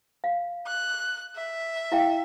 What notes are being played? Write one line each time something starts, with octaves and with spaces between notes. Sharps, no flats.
F5
F#6
E5
E4 F5 G5